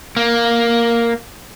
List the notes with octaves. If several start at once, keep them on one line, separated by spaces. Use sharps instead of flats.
A#3